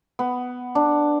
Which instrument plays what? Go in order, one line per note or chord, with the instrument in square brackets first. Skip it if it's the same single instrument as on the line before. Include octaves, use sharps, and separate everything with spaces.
[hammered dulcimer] B3
D4